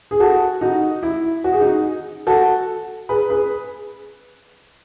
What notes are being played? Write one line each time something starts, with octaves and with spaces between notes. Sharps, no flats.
G#4
F#4 A4
D#4 F#4
E4
F#4
G#4
D#4 F#4
F#4 A4
G#4 B4
G#4 B4